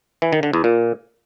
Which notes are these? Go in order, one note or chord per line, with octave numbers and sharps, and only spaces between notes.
E3
D#3
D3
E2
A#2